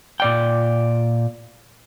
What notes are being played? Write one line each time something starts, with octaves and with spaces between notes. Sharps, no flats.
A#2 D5 G5